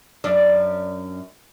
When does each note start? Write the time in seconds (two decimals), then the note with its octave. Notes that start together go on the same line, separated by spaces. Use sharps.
0.24 F#2 D4